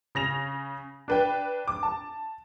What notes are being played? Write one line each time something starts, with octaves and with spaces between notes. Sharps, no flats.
C#3 A#6 F7
D4 B4 G5
D6
A5